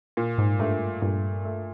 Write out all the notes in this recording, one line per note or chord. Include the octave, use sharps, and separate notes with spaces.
A#2
G#2
G2 A3
G2 A#2
A3